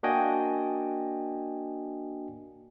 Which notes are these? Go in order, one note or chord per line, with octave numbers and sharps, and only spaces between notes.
A#3 D4 F#4 D#5 G5 G#5